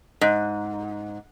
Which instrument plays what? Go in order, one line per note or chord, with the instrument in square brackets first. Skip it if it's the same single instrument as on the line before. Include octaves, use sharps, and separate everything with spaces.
[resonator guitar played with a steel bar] G#2